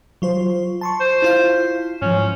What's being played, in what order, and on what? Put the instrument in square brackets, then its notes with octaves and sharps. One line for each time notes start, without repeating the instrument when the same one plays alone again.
[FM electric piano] F#3 F4 C5
A5 C6 C#6
[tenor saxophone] C5
[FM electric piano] E4 F4 F5
[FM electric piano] G#2 F3 [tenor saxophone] C#4